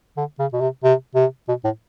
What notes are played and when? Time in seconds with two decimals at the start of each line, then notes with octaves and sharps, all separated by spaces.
0.17 D3
0.39 C#3
0.53 B2
0.61 C3
0.84 C3
1.15 C3
1.48 B2
1.64 A2